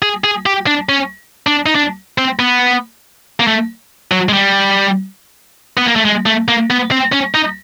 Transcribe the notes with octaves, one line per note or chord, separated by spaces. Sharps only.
G#4
G#4
G4
D4
C#4
D4
D#4
D4
C4
B3
A#3
A3
F#3
G#3
G3
B3
A#3
A3
G#3
A3
A#3
B3
C4
C#4
D#4